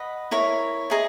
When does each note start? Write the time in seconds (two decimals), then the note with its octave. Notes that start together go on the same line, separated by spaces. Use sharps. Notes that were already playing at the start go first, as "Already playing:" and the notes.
Already playing: B4 D#5 F#5
0.31 E4 A#4 C#5
0.90 E4 G#4 D#5 A#5